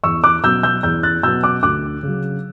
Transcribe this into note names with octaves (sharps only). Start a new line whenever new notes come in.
E2 C#6 E6
D6 F#6
B2 F#3 B3 E6 G6
E6 G6
E2 E6 G6
F#6 A6
B2 F#3 B3 E6 G6
D6 F#6
D2 D6 F#6
C#3 F#3